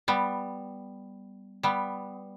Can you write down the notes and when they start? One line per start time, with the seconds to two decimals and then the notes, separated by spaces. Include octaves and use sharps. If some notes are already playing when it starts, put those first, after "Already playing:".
0.08 G3 B3
1.63 G3 B3